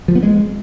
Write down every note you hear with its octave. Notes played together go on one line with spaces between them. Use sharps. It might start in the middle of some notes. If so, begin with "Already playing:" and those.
F3
B3
G#3